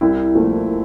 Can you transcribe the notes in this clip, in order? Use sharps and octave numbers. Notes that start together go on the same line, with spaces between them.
C2 E4
A#2 F3 A3